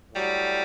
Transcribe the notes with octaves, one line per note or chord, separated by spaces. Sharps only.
A2 F#3 G3